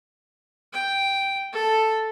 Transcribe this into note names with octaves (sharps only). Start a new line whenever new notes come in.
G5
A4